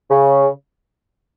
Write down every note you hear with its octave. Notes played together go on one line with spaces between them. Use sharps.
C#3